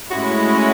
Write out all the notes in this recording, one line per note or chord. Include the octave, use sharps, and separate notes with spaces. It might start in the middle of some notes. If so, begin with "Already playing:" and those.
A2 G#3 C#4 E4 F#4